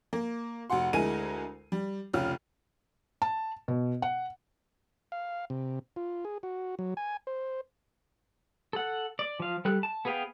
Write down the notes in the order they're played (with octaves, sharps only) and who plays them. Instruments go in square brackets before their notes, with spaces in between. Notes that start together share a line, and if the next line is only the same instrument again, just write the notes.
[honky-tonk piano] A#3
F1 F#4 F#5 C6
D2 G#3 E4 A#4 G#5 D#7
G3
F1 C#2 C#4 F4 F6
[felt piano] A5
B2
F#5
[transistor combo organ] F5
C3
F4
G#4
F#4
F#3
G#5
C5
[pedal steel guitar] A4 F#5
D5
F3 F5
G3 A4 F#6
A5
B3 G#4 B4 F5 G5